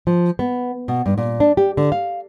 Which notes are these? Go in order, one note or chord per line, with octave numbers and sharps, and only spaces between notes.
F3
B3
B2
G2
A#2
D4
G4
D3
F5